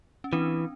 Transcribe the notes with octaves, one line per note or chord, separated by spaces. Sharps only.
C#4
E3 C4 D4